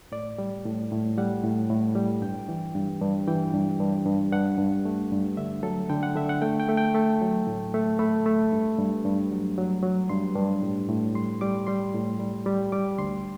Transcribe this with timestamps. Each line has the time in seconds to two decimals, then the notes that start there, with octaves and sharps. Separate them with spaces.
0.12 A2 D5
0.38 G3
0.65 A2
0.92 A2
1.17 G3 F#5
1.44 A2
1.70 A2
1.95 G3
2.22 G2 G5
2.49 E3
2.74 G2
3.01 G2
3.28 E3 G5
3.54 G2
3.80 G2
4.05 G2
4.33 G2 F#5
4.58 G2
4.85 A3
5.12 G2
5.37 D3 E5
5.63 F#3 A4
5.90 D3 G5
6.03 F#5
6.15 D3 E5
6.29 F#5
6.42 A3 G5
6.60 G5
6.68 A3
6.77 G5
6.95 A3 A5
7.21 F#3
7.47 A2
7.74 A3
7.99 A3 B5
8.26 A3
8.52 G2
8.78 G2
9.05 G2
9.32 F#3
9.58 F#3
9.83 F#3
10.09 G2 C6
10.35 G2
10.62 A2
10.89 A2
11.15 G3 C6
11.41 G3 D6
11.67 G3 C6
11.94 A2
12.19 G3
12.46 G3
12.72 G3 D6
12.98 D2 C6